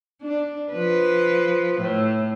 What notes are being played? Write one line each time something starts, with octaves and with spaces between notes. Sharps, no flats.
D4
F3 B4
A2